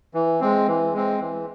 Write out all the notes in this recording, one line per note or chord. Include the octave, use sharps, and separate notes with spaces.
E3
G#3 C4
E3
G#3 C4
E3